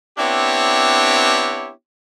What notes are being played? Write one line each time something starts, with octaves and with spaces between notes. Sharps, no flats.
B3 C4 D4 E4 G4 C#5